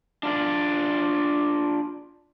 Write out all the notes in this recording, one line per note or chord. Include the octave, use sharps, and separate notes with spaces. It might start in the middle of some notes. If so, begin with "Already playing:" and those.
D4 F4 D5